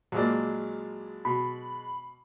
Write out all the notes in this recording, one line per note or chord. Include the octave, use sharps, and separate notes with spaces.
A#1 F#3 G#3 A#3 D5
B2 B5